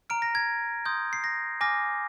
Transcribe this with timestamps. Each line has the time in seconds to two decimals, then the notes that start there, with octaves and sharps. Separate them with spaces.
0.10 A#5 F6 D7
0.22 A#6
0.35 G#6
0.86 C6 D#6 G6
1.13 C7
1.24 A#6
1.61 G#5 D6 F6 A#6